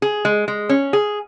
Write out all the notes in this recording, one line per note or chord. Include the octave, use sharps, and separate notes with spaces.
G#4
G#3
G#3
C#4
G#4